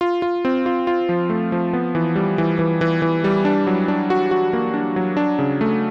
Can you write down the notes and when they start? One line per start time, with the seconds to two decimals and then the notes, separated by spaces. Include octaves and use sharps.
0.01 F4
0.22 F4
0.45 C4
0.66 F4
0.87 F4
1.09 F3
1.30 A3
1.52 F3
1.73 B3
1.95 E3
2.16 G3
2.38 E3
2.59 E3
2.81 E3
3.02 E3
3.24 G3
3.45 D4
3.67 F#3
3.88 D4
4.10 F#4
4.31 F#4
4.53 A#3
4.74 D4
4.96 F#3
5.17 D4
5.39 C#3
5.61 A3